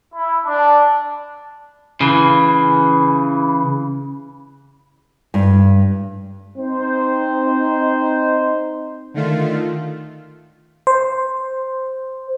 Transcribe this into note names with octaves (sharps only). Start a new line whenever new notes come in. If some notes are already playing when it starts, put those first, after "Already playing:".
E4
D4
C#3 E3
G2
C4 D#4 C5
D3 D#3 A3 F4
C5